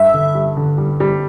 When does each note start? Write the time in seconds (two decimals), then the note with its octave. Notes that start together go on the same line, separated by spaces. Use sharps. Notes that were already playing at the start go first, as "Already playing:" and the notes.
Already playing: G2 E5
0.14 D3
0.35 G3
0.57 D3
0.78 G3
1.00 G3